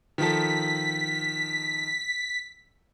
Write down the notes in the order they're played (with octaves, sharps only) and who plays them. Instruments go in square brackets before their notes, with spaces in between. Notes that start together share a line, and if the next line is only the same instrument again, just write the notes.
[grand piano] D#3 F3 A4 [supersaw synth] B6